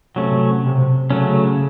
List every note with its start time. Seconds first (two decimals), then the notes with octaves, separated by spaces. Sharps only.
0.16 C3 F#3 A3 C#4
0.64 C3
1.10 C#3 F#3 A3 C#4